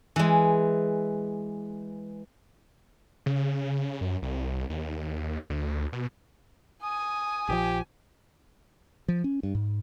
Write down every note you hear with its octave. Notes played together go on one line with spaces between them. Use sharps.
E3 G#3
C#3
F#2
C2
D#2
D2
B2
G#5 D#6
A#1 D#3 F3 G4
F3
C#4
G2
G#2